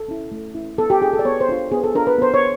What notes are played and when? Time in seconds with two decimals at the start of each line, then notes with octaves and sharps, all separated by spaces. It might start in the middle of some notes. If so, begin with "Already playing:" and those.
Already playing: A4
0.08 C#4 E4
0.32 A3
0.55 C#4 E4
0.78 B3 A4
0.90 G4
1.01 D4 F4 G#4
1.13 A4
1.19 D5
1.25 B3 C#5
1.41 C5
1.48 D4 F4
1.72 B3 G#4
1.84 A4
1.95 D4 F4 A#4
2.07 B4
2.18 B3 C5
2.34 C#5